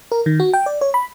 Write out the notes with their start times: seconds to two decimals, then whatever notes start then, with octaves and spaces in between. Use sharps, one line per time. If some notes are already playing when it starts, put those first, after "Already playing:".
0.12 A#4
0.26 D#3
0.40 F#4
0.53 G5
0.66 D5
0.81 C#5
0.94 B5